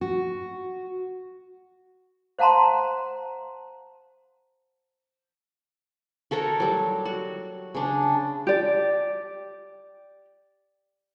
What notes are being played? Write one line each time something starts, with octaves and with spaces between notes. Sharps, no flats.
F#4
C5 F5 F#5 A5 A#5 C6
F#4 A4 A#4 C#5
F#3 G3
F#4
C#3 D4
G4 D5